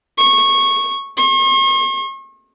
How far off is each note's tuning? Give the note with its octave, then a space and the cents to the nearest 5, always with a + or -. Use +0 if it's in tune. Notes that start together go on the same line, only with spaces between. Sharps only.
C#6 -15
C#6 -45